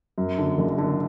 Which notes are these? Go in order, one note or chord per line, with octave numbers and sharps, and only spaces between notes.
F#2
D3
F#1
D3